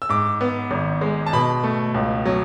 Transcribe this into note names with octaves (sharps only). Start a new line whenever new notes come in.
E6
G#2 D6
B3
G#1
G#3
A5
B2 B5
A3
C#2
F#3